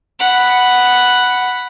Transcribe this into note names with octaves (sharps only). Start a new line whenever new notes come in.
F#5 B5